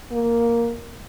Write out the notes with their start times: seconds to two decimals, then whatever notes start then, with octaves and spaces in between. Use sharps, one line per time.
0.11 A#3